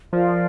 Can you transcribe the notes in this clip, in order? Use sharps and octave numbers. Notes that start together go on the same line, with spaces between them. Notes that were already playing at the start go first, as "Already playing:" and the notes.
F3 F4 A#4 D5